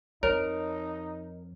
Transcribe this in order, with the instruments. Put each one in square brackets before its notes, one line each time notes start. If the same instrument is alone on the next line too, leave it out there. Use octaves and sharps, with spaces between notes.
[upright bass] F2 [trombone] D#4 [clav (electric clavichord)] A#4 [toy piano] C#5